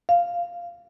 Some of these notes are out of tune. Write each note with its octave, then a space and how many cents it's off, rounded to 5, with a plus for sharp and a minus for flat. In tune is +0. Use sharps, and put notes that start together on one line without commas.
F5 -5